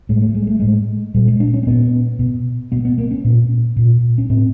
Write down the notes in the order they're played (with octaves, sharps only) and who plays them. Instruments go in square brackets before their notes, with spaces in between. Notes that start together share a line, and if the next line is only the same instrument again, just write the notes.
[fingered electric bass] A2 G#3
A3
G#3
A3
A2 G#3
A#2 G3
G#3
D4
C#4
C4
A#2 B3
B2
B2 B3
B3
A#3
C#4
A#2
A#2
C#4
A2 C4